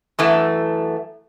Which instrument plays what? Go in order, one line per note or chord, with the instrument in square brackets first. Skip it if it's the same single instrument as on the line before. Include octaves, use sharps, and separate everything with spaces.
[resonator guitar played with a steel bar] F#2 E3 A3